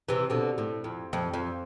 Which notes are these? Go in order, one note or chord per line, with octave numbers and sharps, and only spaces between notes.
C3 E3
B2 D3
A2
F2
F2
F2